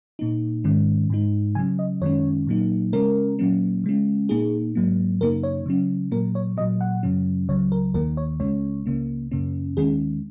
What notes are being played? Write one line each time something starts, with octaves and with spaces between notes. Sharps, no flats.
A#2 A#3 D#4
G#2 D#3 G#3 C#4
G#2 G#3 D#4
C#3 F#3 C#4 G#5
D#5
F#2 D#3 G#3 C#4 C#5
A#2 F#3 A#3 D#4
C#3 G#3 C#4 A#4
A#2 F#3 A#3 C#4
C#3 G#3 C#4
A#2 A#3 D#4 G#4
G#2 F#3 A#3
F#2 C#3 A#3 D#4 A#4
C#5
C#3 F#3 C#4
A#2 F#3 A#3 A#4
C#5
A#2 F#3 A#3 D#5
F#5
F#2 C#3 F#3 C#4
C#2 C#3 F#3 C#5
A#4
D#2 D#3 A#3 A#4
C#5
C#2 C#3 G#3 C#4 C#5
C#2 C#3 A#3 C#4
F#2 C#3 A#3 C#4
D#2 D#3 G#3 C#4 G#4